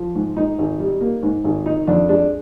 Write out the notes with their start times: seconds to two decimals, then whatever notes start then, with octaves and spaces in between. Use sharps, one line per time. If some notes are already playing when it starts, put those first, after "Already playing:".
Already playing: F3
0.15 G#2
0.36 G#2 D#4
0.58 G#1
0.80 G3
1.01 A#3
1.23 G#2
1.44 G#1
1.66 D#3 D#4
1.87 F2 D4
2.09 G#3 D4